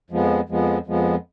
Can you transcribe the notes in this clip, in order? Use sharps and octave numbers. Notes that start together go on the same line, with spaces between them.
F2 F3 G#3 B3
F2 F3 G#3 B3
F2 F3 G#3 B3